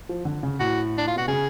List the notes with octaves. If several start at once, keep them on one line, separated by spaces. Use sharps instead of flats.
F3
D3
C#3
A2 F#4
D4
F4
B2 F#4
C#3 G#4